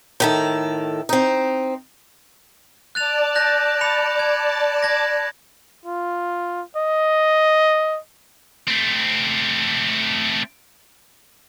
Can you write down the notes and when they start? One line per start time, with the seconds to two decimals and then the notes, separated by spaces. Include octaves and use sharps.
0.20 A2 D#3 A4
1.09 C4 D#4
2.95 D5 A5 F#6 A6 F7
3.35 F#6 G6 A#6
3.81 B5 C#7 F7
4.19 G#6
4.82 G#6 A#6
5.85 F4
6.76 D#5
8.68 A3 C4